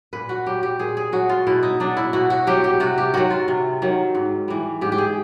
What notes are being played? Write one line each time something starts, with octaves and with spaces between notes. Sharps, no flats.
A#2 B4
F#4
F#3 G4
G4
A#2 G#4
G#4
F#3 F#4
F4
B2 E4
D#4
F#3 D4
E4
B2 F#4
F#4
F#3 G4
G4
C3 F#4
G4
D#3 F#3 F#4
F4
C3
D#3 F#3
G#2
E3 G3
G#2 G4
G4
G#4